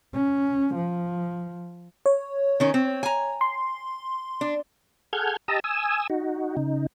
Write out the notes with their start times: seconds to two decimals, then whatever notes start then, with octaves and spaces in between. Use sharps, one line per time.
0.14 C#4
0.75 F3
2.06 C#5
2.60 D#3 C#4
2.74 C4
3.03 G#5 A#5
3.41 C6
4.41 D4
5.13 G#4 A4 F#5 F6 G6 G#6
5.48 G4 D#5 A5 A#5 D#6 E6
5.64 G#5 D#6 E6
6.10 D#4 F#4
6.57 C#3 D#4